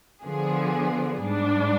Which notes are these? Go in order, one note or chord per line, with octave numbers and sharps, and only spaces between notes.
D3 F3 B3 D4 G#4
G#2 G3 D4